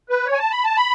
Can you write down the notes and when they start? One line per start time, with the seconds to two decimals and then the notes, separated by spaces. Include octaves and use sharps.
0.09 B4
0.26 C#5
0.33 G#5
0.39 A5
0.52 B5
0.64 A5
0.77 B5